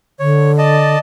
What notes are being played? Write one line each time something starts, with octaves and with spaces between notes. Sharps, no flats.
D3 C#5
D5 D#5 A5